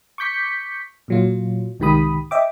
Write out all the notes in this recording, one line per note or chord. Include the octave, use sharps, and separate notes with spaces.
C#6 D6 G6 B6 C#7
A#2 F#3 F4
C2 G#2 D#3 G4 B5 D#6
D#5 E5 G5 D6